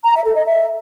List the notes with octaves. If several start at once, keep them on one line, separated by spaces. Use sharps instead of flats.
A#5
E5
A4
D#5
E5